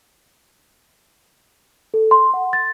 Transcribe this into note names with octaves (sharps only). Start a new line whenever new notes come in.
A4
C6
F#5
A6